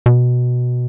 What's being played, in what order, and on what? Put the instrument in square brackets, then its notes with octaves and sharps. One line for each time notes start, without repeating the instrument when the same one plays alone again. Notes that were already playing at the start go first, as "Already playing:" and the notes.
[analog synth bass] B2